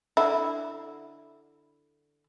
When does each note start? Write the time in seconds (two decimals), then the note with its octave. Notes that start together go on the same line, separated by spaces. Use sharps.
0.17 D3 E4